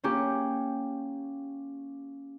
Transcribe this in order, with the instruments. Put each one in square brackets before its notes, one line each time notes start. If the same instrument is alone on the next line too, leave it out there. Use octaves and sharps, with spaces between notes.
[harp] A#3 C#4 G4